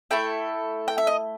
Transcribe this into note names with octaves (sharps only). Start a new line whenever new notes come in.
A3 E4 A4 G5
G5
E5
D#5